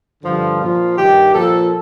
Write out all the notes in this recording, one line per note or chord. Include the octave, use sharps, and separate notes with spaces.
G2 D3 F3
A#2 F3 F4
G2 D#3 G4
A#2 F3 A4